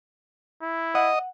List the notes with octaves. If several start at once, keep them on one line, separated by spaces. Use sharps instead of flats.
E4
D#5 F#5